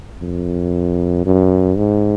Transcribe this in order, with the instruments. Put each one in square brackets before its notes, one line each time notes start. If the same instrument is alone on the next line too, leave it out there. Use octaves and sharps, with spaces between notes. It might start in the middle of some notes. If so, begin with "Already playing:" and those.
[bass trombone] F2
F#2
G#2